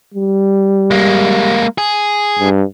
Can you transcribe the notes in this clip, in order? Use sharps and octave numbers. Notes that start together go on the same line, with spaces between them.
G3
G#3 A#3
G#4
G2